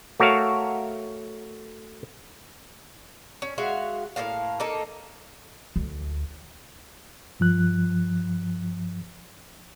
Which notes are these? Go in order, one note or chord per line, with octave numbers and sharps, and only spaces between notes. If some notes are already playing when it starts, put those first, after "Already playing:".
A3 F#4 A#4 C#5 F5
C#4
G#3 F#4 E5 F5
A2 C3 A#3 F5
A#3 D#4 A4
D2
G2 F3 F#6